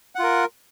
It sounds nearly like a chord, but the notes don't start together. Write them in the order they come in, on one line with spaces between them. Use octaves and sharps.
F#5 F4 A#4